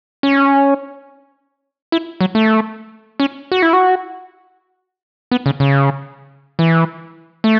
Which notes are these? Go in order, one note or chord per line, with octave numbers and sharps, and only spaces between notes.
C#4
E4
F#3
A3
C#4
F#4
E4
F#4
B3
C#3
C#3
E3
A3